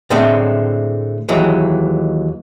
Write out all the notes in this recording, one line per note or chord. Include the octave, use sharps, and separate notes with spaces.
A2 D3 G#3 A3 C4
D#2 E3 F#3 G#3